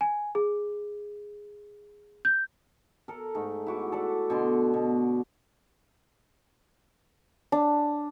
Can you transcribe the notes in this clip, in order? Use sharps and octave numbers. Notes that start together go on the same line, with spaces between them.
G#5
G#4
G6
A4 A#4
G#2 A3
E4 F#4 D6
A4 D5
B2 D3 C6
B2
D4